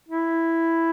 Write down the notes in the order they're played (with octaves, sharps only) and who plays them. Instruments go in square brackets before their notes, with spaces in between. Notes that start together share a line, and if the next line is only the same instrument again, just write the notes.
[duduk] E4